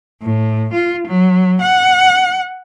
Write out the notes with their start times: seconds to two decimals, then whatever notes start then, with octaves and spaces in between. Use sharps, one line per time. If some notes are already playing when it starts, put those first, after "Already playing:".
0.22 A2
0.73 F4
1.07 F#3
1.61 F#5